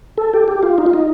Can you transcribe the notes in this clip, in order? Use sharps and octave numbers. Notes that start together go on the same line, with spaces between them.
A4
G4
G4
F4
D#4
F4
D#4